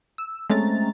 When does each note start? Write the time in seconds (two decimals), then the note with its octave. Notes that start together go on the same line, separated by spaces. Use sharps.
0.18 E6
0.50 G#3 A3 C4 C#4 A#5 A6